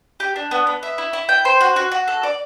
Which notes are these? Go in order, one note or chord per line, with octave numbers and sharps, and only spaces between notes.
G4
D4
B3
B3
E5
E4
E4
G5
C5
F#4
F#4
F#4
A4
D5